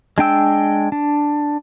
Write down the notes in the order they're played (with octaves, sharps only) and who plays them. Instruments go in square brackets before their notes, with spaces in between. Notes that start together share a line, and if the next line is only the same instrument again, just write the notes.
[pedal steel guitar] G#3 D4 G5 E6
D4